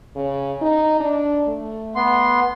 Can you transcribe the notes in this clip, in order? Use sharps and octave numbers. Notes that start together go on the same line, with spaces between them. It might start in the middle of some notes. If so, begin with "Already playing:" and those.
C#3
D#4
D4
A3
B3 C6